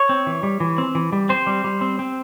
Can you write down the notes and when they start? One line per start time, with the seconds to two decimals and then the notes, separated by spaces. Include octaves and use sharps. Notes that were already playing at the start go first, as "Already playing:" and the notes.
Already playing: C#5
0.09 C4
0.27 E3
0.43 G3
0.60 E3
0.78 C4
0.95 E3
1.13 G3
1.29 C4 C5
1.47 G3
1.64 G3
1.81 C4
1.99 C4